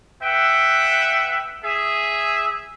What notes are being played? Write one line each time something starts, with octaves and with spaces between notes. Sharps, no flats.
B4 E5 F#5 G5
G#4 E5